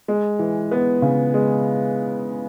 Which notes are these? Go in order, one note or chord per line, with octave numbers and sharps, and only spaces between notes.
G#3
E3
B3
C#3
G#3